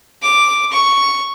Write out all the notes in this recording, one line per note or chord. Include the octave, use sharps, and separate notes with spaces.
D6
C#6